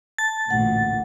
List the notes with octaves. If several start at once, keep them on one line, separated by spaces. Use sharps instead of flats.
A5 A6
A1 D2 A#2 F#5